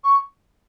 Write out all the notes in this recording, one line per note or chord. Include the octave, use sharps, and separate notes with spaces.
C#6